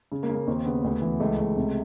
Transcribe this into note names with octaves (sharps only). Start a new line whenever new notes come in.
C#3
A#3
C#3
A#3
D#2 C4
C#3 B3
D2
E3
C#2 A3
C#2
C3